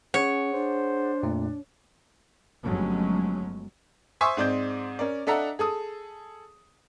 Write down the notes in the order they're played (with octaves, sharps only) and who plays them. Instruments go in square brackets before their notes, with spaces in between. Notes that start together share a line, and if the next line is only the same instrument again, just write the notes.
[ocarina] C#4 [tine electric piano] G#4 F#5 [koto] C#5
[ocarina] D4 [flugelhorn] C5
[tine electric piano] F2 A#2 A3
[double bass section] G1 F3 F#3 G#3 A3 C#4
[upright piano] C5 E5 G#5 C6 C#6 D#6
G#2 C4 D5 D#5 G6
C#4 A#4 D5
D4 A4 D#5 E5 F#5 A#5
G#4 A4 D#6